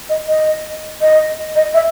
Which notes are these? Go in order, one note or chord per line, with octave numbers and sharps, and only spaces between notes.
D#5
D#5
D#5
D#5
E5